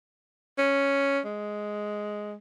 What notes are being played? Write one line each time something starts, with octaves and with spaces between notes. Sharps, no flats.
C#4
G#3